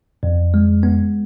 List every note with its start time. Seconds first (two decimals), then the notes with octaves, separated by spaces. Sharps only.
0.23 F2
0.54 G#3
0.83 B3